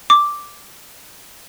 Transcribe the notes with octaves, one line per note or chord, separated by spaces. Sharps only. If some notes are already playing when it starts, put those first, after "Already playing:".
D6